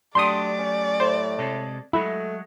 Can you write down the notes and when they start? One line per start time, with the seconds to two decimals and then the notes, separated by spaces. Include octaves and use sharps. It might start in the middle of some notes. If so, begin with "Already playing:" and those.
0.15 F#3 A3 D4 G4 D5 C6 D#6
0.58 C#4
1.00 A2 C5
1.39 C3 G#3 A4
1.93 F#3 G#3 A3 E4